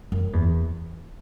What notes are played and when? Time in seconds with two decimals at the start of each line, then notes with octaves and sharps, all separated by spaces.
0.12 F#2
0.33 E2